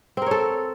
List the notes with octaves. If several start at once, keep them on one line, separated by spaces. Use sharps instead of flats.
C4 A4 A#4 C#5